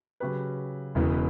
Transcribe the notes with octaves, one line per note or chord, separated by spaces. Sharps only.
C#3 F#3 C#4 G4 B4
E1 E2 C#3 E3 B3